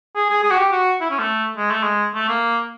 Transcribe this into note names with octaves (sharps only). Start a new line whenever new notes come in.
G#4
G#4
G#4
F#4
G4
F#4
E4
C#4
A3
G#3
A3
G#3
A3
A#3